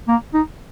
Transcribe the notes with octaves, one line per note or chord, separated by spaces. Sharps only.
A#3
D#4